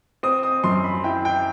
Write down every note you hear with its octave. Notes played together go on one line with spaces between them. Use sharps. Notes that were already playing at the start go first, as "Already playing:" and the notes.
C4 D#6
D#6
F#2 C6
B5
E4 G5
G5